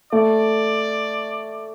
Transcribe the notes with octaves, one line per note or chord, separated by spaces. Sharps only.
A3 D5